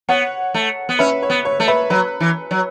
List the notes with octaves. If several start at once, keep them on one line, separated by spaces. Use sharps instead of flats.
B3 C#5 F#5
A3
B3
C#4 B4 E5
C#5
B3
C#5
A3
B4 E5
F#3 B4
E3
F#3